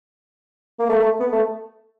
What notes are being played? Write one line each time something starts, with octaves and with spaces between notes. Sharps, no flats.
A#3
A3
A3
B3
A3